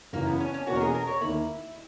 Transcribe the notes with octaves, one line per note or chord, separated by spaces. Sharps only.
F#2 C#3 E3 A#3
B3
C#4
C#4
E2 B2 A#3 C#4 F#4
A#4
G#4
A#4
C#5
D#2 D#3 A#3 E4